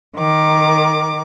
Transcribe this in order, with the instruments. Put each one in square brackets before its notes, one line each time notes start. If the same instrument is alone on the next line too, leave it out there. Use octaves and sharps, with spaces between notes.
[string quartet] D#3 A#4 D6